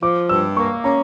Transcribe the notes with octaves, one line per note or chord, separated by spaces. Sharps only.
F3 D6
G2 E6
A#3 C#6
C#4 A#5